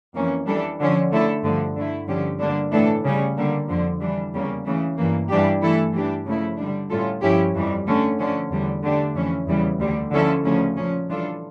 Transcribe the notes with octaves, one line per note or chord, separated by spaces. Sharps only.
F2 E3 A#3 C#4
E3 G3 D4 A4
D3 F3 C#4
D3 A3 E4 A4
G2 D3 F3 A3
D3 A3 E4
G2 D3 F3 C#4 G4
D3 G3 A#3 D4
A2 E3 A3 D4 A4
C#3 G3 C#4
D3 G3 A#3
F2 D3 F3
E3 G3 D4
E2 C#3 G3 A#3 C#4
C#3 E3 A3
G2 E3 A#3
G2 E3 G3 D4 G4
E3 A3 E4 A4
E3 G3 D4 G4
C#3 F3 A3 E4
D3 G3 D4
A2 G3 C#4 F4 A4
G2 F3 C#4 E4 G4
F2 E3 G3
D3 A3 C#4
D3 F3 C#4
E2 D3 G3
D3 A3 D4 G4
F2 E3 A3 C#4
E2 C#3 E3 G3
D2 D3 G3
D3 F3 C#4 E4 A4
D2 C#3 F3 A3 C#4
A#2 F3 C#4
E3 G3 D4 F4 A4